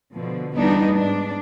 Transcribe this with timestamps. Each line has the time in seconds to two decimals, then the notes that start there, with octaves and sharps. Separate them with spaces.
0.13 B2 D3 F3
0.56 E2 G3 B3 D4 D#4
0.92 G#2 D4